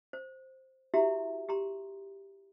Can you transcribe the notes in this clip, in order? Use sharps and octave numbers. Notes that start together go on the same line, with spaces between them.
C5
E4 F#4 G4 E5 A#5 C6
G4 A#5 C6